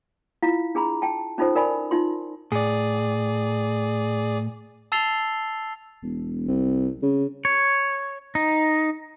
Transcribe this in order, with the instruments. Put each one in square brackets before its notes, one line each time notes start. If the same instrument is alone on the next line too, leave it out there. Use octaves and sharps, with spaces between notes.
[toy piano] E4 F4 F5
D4 G#4 A#5 B5
G5 A5
C#4 D#4 F4 A4 C5
A#4 D5 G#5 B5
D#4 F4 C6
[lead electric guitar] A2 [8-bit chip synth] G#4 D5
[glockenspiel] A5 E6 A6 C7 F7 G7
[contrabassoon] E1
C2
C#3
[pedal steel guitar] C#5
D#4